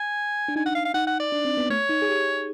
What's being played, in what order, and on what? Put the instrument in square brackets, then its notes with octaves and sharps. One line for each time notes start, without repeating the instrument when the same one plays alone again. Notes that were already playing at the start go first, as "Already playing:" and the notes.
Already playing: [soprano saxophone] G#5
[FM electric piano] D4
[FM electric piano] D#4 [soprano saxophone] G#5
[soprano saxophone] F#5
F5
F5
[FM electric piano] D#4 [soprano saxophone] F#5
[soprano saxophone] F#5
D5
[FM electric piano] D4
C4
B3
[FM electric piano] A3 [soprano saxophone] C#5
[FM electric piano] D#4
G#4
G4